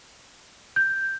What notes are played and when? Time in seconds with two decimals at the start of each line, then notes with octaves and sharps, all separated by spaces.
0.76 G6